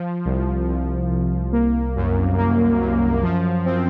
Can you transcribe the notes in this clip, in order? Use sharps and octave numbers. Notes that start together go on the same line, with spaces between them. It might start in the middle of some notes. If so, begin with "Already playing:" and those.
Already playing: F3
C2
C2
C2
A#3
F#2
A#3
F#2
F3
C4